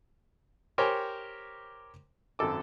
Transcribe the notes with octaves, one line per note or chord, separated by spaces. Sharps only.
G4 A#4 C5 C#5 G5 G#5
G#1 F#2 A4 D6